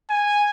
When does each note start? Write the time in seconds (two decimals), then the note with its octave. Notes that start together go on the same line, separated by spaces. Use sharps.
0.10 G#5